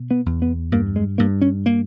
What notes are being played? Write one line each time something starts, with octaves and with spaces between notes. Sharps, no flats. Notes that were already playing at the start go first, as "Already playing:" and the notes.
Already playing: B2
B3
E2
B3
G2 A#3
G#3
G2 A#3
C#4
A#3